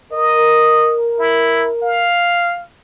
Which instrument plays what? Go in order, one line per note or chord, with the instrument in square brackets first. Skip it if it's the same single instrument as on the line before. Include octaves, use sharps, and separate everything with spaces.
[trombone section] A#4 [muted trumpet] D#5
[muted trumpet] E4
F5